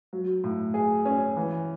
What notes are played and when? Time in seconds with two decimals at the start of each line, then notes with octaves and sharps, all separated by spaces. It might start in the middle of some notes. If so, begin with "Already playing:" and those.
0.13 F#3
0.44 A2
0.74 G#4
1.05 C#4
1.37 E3